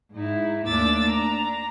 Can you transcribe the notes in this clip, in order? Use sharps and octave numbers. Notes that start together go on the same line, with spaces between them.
G#2 D#4 E4
D#2 A3 D4 D6 E6 A6
D4 A#5